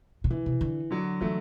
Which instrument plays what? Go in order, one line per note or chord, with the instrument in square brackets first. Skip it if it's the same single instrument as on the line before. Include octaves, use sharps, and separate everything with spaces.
[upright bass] C3
[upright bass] D3 [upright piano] E3
[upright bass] C3
D3
[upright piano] D3 F#3
[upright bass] E3 [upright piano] F#3 A3